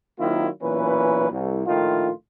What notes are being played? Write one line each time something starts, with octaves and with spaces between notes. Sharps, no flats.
D#3 F#3 A#3 C4 E4 F4
B1 A#2 E3 C#4 B4
C2
A#1 A2 D#3 F4